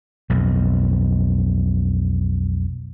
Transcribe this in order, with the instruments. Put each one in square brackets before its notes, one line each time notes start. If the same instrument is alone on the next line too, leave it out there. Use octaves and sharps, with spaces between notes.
[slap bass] B1 F2